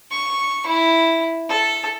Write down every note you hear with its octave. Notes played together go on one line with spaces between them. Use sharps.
C#6
E4
A4